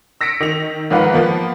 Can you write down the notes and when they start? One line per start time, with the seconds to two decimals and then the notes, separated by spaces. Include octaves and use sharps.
0.21 E6 A#6 B6 C#7 D7
0.40 D#3 F7
0.90 G#2 D#3 F3 B4 F5 F#5
1.13 F3 A#3 B3